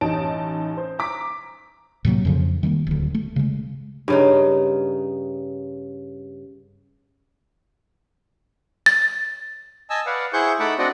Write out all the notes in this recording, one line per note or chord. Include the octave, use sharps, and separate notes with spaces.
A1 D#4 A5 D7
C5
A#5 D6 B6
A2 C3 F#3 A#3
F2 C#3 F3
D#3 G3 G#3 A#3
D1 D2
A3
C#3 G#3
G2 C#3 D#4
A6
D#5 G#5 A5 E6
B4 D5 F5 F#5
E4 G#4 C5 F#5 C#6 G6
A3 D#4 F#5 A5 B5 D6
C4 D4 F#4 D5 D#5 F#5